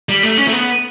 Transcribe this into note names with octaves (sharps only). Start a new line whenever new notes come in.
G3
A3
C#4
A3
B3